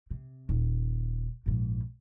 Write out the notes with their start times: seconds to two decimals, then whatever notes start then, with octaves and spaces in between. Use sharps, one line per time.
0.11 C3
0.49 D#1
1.46 A#1 G#2